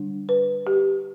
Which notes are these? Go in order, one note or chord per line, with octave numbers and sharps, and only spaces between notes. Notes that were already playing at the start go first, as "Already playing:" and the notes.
Already playing: D3 G3 D4
B4
G4